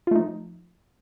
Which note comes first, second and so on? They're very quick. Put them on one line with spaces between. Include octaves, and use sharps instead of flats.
F4 A3 D#4 F3